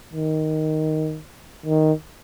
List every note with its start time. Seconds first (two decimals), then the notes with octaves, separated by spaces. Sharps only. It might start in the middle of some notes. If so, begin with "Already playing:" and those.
0.13 D#3
1.66 D#3